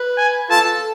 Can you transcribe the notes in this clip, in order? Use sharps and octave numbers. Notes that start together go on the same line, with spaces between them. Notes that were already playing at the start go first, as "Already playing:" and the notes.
Already playing: B4
G#5
F4 A4 A5